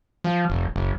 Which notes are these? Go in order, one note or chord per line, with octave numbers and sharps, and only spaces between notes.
F3
F1
F#1